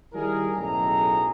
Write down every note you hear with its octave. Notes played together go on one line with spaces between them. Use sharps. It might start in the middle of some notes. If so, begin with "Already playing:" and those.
D#3 G3 E4 G#4 A#4
B1 F#2 A2 G#4 A4 A#5